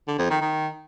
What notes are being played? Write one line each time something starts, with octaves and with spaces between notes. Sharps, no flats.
D3
F2
D#3
D#3